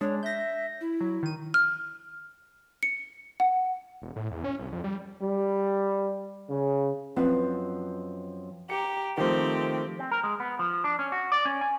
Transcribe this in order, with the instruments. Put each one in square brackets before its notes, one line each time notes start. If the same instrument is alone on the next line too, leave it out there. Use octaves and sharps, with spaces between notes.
[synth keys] G#3 D4 [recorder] C#5
[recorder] E5 [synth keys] G6 A#6
[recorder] E4
[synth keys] F#3
D#3 D#7
[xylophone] F6
C#7
F#5
[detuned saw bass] E1
A2
E2
C#4
C2
F2
G3
[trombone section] G3
C#3
[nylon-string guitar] F#2 F3 C4 B4 D#5 F#5
[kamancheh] G4 A#5 [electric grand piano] C#7
[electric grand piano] D#3 F3 A3 [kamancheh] C4 G4
[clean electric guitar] C4
A#4
G#3
B3
F3
D4
C#4
F#4
D5
C#4
G#5